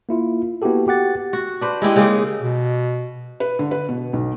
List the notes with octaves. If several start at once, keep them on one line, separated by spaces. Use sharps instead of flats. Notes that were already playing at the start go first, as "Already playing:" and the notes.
A#3 E4 F4
A#3 B3 E4 F#4 G4 A4
F#4 G4 F#5 A6
F#4
D4 B4 C5
G#3 E4 G4 D#5
C#3 G#3 A#3 D#4
B2
B4
D3
B4
B2
B1